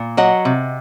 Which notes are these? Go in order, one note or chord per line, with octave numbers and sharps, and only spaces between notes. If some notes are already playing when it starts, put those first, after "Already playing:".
Already playing: A#2
F#3 D#5 F#5
C3